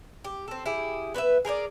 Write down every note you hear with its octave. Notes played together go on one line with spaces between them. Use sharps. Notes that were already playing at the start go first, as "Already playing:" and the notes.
G4
C4 A4
E4 G4 G#4
B3 B4 C#5 E5
G#4 A#4 C5 D5